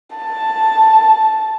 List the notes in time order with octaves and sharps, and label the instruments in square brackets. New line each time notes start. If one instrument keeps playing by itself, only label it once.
[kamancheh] A5